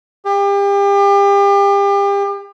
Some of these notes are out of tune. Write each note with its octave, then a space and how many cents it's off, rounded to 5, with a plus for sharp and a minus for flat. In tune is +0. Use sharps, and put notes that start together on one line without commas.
G4 +35